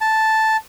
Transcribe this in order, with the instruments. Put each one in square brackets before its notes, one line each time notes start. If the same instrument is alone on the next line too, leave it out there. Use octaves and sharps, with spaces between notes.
[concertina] A5